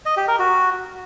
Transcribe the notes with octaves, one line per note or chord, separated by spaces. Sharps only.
D#5
G4
A#4
F#4